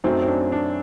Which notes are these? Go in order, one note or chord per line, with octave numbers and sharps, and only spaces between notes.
F#2 F#3 A3 C4 D#4
C4
D4
D4